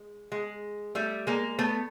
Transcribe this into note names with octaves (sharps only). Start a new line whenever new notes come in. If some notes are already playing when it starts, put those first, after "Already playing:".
Already playing: G#3
G#3
G3 A3
G#3 A#3
A3 B3